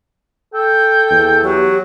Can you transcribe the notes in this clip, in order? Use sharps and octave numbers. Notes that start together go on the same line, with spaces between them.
A4 G5
E2
F#3 G4